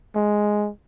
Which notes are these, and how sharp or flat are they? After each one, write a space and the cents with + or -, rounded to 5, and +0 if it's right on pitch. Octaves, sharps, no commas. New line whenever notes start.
G#3 +5